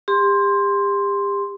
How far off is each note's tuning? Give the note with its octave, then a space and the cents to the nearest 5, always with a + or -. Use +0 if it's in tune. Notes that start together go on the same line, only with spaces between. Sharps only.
G4 +35 C6 +0